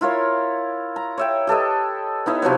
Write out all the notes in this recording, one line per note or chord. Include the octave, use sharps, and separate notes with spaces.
E4 F4 A#4 C#5
A#5
C#5 E5 G5
G4 A4 B4 D#5
B3 D#4 E4 C#5
C3 F3 F#3 B3